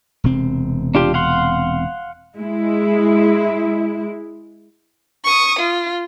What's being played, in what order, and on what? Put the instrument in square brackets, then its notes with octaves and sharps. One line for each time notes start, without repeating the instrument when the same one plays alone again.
[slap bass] E1 C3 C4
[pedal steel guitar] D4 F4 G4
F5 F#5 C6
[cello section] G#3 E4
[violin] C#6 D#6
F4